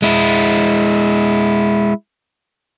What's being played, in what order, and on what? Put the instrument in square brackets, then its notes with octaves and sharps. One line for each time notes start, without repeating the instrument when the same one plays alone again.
[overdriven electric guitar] G#3 E4